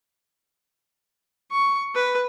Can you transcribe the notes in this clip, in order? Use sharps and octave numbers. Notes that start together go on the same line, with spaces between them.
C#6
B4